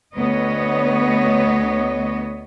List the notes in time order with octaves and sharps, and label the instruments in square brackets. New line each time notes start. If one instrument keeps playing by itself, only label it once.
[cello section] D2 B3 C#5 D#5